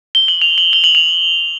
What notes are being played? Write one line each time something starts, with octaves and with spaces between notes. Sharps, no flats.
G7
F#7
F7
F#7
G7
F#7
F7